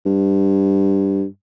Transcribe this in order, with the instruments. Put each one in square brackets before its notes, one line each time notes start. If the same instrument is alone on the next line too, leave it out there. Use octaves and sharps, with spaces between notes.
[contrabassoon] G2